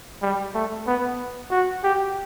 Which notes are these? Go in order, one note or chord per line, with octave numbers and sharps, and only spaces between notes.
G3
A3
B3
F#4
G4